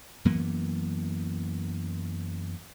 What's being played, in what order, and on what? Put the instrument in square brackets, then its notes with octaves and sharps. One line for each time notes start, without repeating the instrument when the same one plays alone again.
[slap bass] F#2 E3 A#3 B3